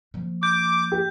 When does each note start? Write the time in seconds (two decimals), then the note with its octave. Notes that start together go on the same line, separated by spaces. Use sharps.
0.14 F3 A#3
0.43 D6 G6
0.92 G4